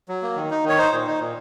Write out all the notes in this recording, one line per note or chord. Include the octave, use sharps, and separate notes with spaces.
F#3
A#3
D#3
D#4
D#3
C#5
D#4 C5
A#2
D#4
A#2